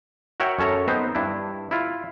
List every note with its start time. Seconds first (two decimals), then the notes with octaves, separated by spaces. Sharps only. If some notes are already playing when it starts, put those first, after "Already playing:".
0.40 F#4 A#4 C#5 E5 F#5 G5
0.59 F#2 C#4 A4 C#5 A#5
0.88 B3 C4 D#4 C5
1.15 G2 D4 E4
1.71 E4 F4